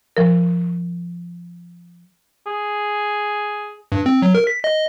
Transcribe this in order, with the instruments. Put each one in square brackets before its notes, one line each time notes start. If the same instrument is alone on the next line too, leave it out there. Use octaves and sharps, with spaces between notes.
[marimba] F3 A#4
[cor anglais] G#4
[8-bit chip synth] G2
C4
F#3
A#4
B6
D#5